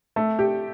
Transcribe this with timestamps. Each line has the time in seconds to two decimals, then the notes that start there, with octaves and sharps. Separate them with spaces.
0.16 A3
0.39 G4